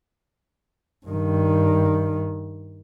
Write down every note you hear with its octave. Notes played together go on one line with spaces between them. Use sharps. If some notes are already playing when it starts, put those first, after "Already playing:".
G2 D#3